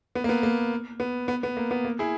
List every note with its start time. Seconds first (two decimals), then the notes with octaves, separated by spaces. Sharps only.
0.15 B3
0.24 A#3
0.29 B3
0.43 A#3
1.00 B3
1.28 B3
1.43 B3
1.57 A#3
1.71 B3
1.85 A#3
1.99 E4 G#4